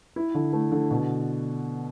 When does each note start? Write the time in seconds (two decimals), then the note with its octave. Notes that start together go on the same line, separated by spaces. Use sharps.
0.16 E4
0.35 D3
0.53 A3
0.72 D3
0.90 B2